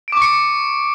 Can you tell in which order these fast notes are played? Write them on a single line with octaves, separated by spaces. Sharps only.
D7 D6 C#6 C#7